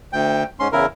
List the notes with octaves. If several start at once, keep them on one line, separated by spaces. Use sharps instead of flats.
D2 G5
G#2 C#4 C6
E2 C#3 E4 A#4